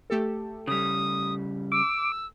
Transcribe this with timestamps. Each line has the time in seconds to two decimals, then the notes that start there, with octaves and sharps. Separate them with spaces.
0.10 A3 G4 A4
0.67 C#3 G3 D#6
1.72 D6 E6